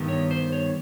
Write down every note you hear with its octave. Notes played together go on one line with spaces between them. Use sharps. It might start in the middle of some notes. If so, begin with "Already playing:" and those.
Already playing: G2 D#3 G3 B3
C#5
C5
C#5